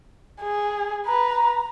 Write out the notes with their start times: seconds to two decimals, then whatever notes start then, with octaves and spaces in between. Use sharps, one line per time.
0.41 G#4
1.06 B4 A#5